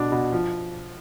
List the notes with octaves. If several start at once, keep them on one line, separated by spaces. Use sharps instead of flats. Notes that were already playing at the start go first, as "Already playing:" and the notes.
Already playing: B2 D4
B2
F3